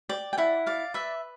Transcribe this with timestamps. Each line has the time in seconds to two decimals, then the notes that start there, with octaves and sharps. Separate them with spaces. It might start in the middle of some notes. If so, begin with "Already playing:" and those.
0.09 D5 G5
0.33 G5
0.38 E4 F#5
0.66 D5 F5
0.94 B4 E5